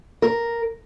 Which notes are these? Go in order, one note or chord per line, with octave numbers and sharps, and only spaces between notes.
A#4